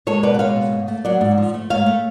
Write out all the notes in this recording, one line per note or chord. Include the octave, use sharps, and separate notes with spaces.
G#3 A4 C#5
B2 B4 D5
F#5
G#3 C#5 F5
B2
G#2
A3
F#3 D5 F#5
G#2
F3
A3
G#2 C#5 F5
A3